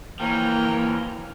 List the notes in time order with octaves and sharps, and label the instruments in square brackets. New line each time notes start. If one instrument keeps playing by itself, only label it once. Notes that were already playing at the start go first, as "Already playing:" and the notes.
[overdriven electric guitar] E3 F3 [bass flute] A#3 [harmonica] A#4 C#5 G5